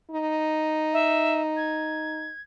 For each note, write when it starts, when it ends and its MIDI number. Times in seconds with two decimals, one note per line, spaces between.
0.12 2.31 63
0.93 1.41 76
1.57 2.41 92